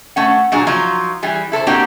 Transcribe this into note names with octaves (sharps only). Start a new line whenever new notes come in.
A3 C#4 F#5
A#2 F#3 D4 G#4
F3 F#3 D#4 F4
E3 G3 G#4
E4 A4 A#4 C5
A#3 C4 D4 D#4 F#4 G4